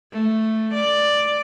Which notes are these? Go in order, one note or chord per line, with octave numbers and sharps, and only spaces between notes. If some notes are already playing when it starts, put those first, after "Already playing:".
A3
D5